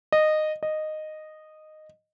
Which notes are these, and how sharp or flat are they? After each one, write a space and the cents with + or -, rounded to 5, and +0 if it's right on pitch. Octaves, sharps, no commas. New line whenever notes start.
D#5 -15
D#5 -10